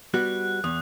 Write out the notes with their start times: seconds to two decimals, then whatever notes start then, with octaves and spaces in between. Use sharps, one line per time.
0.14 G3 B3 F#4 F#6
0.64 E2 D#6